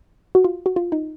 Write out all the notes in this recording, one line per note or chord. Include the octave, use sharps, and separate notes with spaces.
F#4
F4
F#4
F4
D#4